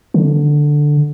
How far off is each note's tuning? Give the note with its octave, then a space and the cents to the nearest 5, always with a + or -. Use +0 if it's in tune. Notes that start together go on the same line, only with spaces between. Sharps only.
D3 +5